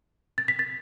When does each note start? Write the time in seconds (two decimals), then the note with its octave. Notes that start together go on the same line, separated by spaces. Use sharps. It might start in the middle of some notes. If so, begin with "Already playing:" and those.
0.38 A6
0.48 B6
0.59 A6